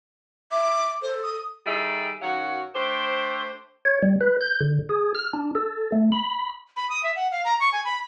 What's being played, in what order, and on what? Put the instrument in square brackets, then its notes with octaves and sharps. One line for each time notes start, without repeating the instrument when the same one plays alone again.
[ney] E5 [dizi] D6
[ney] A4 [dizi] C5
[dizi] D#6
[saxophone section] D#3 G3 D#4 G#4 A4 E5
F#2 D#3 F#3 F#4 F5 F#5
A3 D4 G4 C5
[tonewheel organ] C#5
G3
B4
G6
D3
G#4
F6
D4
A4
A3
B5
[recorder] B5
D#6
E5
F#5
F5
A#5
C#6
G#5
B5